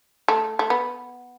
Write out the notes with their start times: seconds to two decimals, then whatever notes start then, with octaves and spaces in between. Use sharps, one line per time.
0.28 A3
0.59 A3
0.70 B3